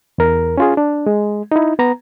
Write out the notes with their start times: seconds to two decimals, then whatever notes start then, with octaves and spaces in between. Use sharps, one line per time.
0.18 E2 A#4
0.58 C#4 F4 G#4
0.77 D4
1.06 G#3
1.52 D#4 E4
1.79 B3 A#5